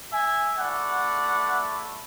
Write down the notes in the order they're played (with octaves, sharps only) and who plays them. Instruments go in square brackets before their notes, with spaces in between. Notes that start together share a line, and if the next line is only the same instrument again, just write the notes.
[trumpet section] E5 G#5
A3 E4 D5 F#5